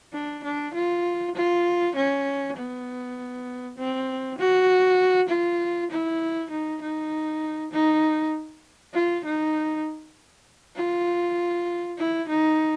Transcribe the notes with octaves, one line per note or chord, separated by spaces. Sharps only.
D4
D4
F4
F4
C#4
B3
C4
F#4
F4
E4
D#4
D#4
D#4
F4
D#4
F4
E4
D#4